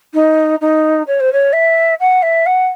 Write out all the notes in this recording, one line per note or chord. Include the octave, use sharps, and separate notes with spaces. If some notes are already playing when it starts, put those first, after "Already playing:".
D#4
D#4
C#5
C5
C#5
E5
F#5
E5
F#5